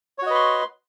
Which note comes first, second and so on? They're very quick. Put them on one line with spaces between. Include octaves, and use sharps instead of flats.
C#5 F#4 D#5 B4 C6